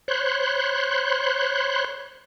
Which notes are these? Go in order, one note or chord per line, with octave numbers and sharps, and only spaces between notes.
C5 C#5 B5 C6 F#6